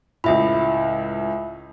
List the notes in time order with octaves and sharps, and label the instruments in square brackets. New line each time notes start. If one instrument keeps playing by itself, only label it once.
[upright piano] C#2 A2 [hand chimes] E5 B5